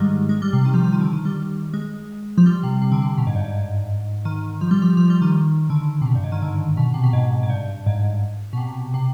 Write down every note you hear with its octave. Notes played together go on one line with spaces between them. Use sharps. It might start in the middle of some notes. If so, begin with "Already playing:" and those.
Already playing: G#2 D#3 G3 G#3
G#3
G3
C3
D#3
F3
F3
D#3
D3
D#3
G3
G#3
F3
G3
C3
C3
D3
C3
B2
G#2
G2
G#2
D#3
F3
G3
F3
F3
G3
D#3
D3
C3
B2
G2
G#2
D#3
D3
B2
C3
B2
G#2
G#2
G2
G#2
B2
C3
C3